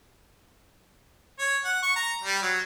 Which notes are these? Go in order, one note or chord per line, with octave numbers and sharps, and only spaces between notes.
C#5
F#5
C#6
A#5
G3
F#3